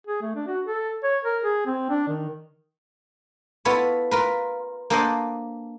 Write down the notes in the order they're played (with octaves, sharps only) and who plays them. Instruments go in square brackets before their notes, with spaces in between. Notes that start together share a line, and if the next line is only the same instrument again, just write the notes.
[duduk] G#4
A3
D4
F#4
A4
C#5
A#4
G#4
C4
D4
D#3
[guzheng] B3 E4 F4 A4 C#5 A5
F4 A#4 B4
A#3 D4 A4 C5 D#5 F#5